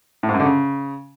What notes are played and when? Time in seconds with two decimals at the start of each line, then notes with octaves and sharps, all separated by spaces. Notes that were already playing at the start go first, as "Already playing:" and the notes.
0.23 A2
0.29 G#2
0.34 F#2
0.40 D3
0.45 C#3